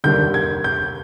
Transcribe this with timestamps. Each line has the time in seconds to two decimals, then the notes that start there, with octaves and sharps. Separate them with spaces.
0.04 F1 D#2 D3 G3 G6
0.34 G#6
0.64 G6